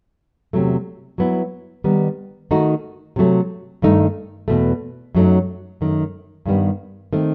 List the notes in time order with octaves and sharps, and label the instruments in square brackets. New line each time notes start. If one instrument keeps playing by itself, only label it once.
[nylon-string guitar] E2 C3 F#3 A3
F#3 B3 E4
D#3 G3 B3 D#4
D#3 A3 D#4 F#4
C3 F#3 A3
G2 D#3 A3 D#4
E2 B2 A3
F#2 F#3 A3 D#4
F#2 D#3 A3
G2 D#3 G3 B3
D#3 A3 C4